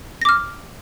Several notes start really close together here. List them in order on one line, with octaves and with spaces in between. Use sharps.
A#6 D6 F6